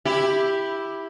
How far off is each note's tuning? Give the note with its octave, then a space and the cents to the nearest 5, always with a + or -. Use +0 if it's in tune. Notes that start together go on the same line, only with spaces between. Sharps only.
E4 +0 G4 +5